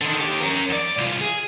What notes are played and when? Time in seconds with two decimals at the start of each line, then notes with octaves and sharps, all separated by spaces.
0.01 D3 D#3
0.20 D#3 G4
0.41 C#4 A#4
0.69 E2 D5
0.98 C2 F4
1.21 G#4